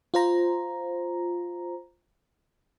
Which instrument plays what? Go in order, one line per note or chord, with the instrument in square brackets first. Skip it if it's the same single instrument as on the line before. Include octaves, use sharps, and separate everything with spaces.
[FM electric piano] F4 C5 A#5